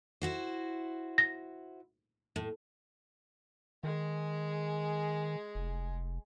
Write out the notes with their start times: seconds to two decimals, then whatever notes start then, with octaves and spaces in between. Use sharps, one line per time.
0.22 E4 F#4 C5
1.18 A#6
2.36 A2
3.84 D#3 G#3 G#4
5.55 F1